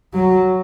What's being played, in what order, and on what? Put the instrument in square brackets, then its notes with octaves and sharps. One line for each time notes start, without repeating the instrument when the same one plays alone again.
[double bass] F#3